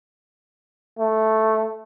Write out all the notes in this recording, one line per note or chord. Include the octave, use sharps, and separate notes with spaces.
A3